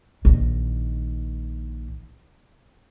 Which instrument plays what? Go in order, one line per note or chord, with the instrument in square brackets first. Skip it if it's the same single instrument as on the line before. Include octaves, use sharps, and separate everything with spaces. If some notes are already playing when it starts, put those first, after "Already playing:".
[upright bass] A#1 D#3